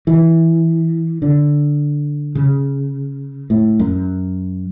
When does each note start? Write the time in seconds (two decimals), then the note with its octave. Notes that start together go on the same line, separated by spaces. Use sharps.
0.07 E3
1.22 D3
2.35 C#3
3.50 A2
3.79 F#2